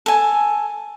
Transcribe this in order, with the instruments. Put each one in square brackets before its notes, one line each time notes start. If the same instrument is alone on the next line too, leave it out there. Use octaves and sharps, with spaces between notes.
[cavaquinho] A4 G#5